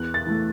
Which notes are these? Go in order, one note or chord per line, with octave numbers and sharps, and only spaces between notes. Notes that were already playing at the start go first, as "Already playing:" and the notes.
Already playing: E2 F#6
A6
E3 A3